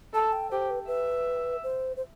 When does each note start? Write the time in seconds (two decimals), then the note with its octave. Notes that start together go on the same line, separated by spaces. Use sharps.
0.13 A4 A5
0.33 G5
0.51 G4 C5
0.70 B4
0.87 B4 E5
1.64 C5
1.97 C5